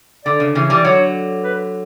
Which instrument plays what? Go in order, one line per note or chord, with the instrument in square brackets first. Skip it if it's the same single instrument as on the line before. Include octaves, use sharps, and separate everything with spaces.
[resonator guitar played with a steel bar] D3 [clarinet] D5
[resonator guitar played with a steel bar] C#3
C#3 E3
E3 G3
[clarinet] D5
[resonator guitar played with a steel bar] D3 F#3 [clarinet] C#5
[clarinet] B4